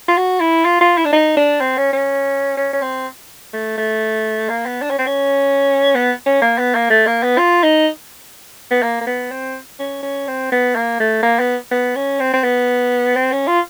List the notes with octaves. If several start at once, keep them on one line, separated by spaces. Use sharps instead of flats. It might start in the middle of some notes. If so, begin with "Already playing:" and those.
F4
F#4
E4
F4
F4
E4
D4
D#4
D4
C4
C#4
C#4
C#4
C#4
C4
A3
A3
A#3
B3
D4
C#4
C4
C#4
B3
C#4
A#3
B3
A#3
A3
A#3
B3
F4
D#4
B3
A#3
A#3
B3
C4
C#4
C#4
C4
B3
A#3
A3
A#3
B3
B3
C#4
C4
C4
B3
C4
C#4
F4